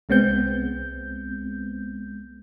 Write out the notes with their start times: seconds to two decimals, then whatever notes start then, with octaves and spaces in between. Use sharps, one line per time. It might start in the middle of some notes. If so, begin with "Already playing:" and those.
0.09 C2 G#3 B3 C4 G6